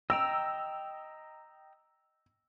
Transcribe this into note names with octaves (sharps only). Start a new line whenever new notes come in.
D#5 G5 A#5 E6